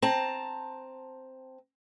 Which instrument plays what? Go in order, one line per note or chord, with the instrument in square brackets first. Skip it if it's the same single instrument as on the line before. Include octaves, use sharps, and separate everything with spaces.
[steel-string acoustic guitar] C4 A5 A#5